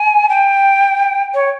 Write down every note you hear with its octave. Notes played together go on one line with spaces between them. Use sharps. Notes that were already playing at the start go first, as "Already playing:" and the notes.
Already playing: G#5
G5
C#5